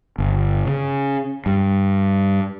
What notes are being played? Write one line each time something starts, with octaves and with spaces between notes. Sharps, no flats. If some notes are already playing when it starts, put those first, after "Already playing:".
G1
C#3
G2